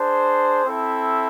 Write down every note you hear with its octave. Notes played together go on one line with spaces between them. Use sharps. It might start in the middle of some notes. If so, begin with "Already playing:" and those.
Already playing: D4 G#4 C5
C4 E4 A4 E5